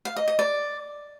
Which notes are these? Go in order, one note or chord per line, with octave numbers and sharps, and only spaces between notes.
F5
D#5
D#5
D5